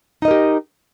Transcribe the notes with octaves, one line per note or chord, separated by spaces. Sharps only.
D#4 G4 A#4 D#5